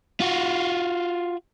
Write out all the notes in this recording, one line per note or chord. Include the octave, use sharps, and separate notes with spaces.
F4 F#4